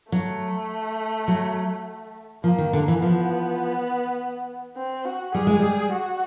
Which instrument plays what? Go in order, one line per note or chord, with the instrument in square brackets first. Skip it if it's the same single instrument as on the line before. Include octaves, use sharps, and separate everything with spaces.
[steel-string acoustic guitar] F#3 [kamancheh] A3
[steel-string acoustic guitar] F#3
[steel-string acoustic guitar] F3 [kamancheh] A#3
[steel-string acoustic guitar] D#3
D3
E3
[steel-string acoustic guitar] F3 [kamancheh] B3
[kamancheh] C4
F#4
[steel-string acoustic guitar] G3 [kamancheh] G#4
[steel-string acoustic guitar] G#3
G3
[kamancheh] F#4